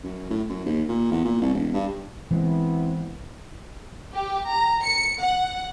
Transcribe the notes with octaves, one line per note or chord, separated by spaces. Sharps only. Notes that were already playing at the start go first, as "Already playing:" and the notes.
F#2
A2
F#2
D#2
A#2
E2
A#2
C2
E1
G2
E3 G#3 B3 C4 E4
G4
A#5
C#7
F#5